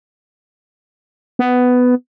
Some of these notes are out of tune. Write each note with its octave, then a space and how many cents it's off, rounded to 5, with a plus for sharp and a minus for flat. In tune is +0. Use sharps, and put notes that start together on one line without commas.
B3 +10